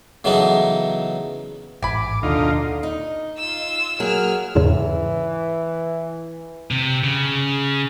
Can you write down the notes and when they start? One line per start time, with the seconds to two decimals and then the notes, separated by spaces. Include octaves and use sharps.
0.24 C#3 E3 F#3 B3 D#4 A4
1.82 A1 G#2 G#5 B5 D6
2.23 D#2 B2 D3 D#4 F4
2.83 D#4
3.38 F4 E6
4.00 F#3 A#3 G#4 E6 F6
4.55 E2 G#2 C#3 E3
6.71 C3
7.04 C#3